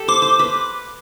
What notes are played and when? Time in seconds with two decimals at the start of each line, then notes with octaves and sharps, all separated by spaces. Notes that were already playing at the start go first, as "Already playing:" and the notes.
Already playing: G4 A4
0.08 C5 D6
0.22 C5
0.39 B4